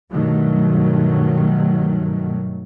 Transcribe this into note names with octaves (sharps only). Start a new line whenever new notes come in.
G2 B2 D#3 F#3 A3